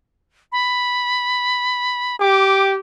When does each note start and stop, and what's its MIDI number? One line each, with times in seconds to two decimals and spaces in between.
0.52 2.16 83
2.20 2.79 67
2.20 2.71 86